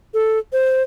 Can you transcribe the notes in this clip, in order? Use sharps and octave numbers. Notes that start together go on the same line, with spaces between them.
A4
C5